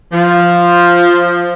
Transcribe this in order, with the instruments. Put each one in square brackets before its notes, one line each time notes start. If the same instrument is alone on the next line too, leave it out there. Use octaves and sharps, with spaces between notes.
[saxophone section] F3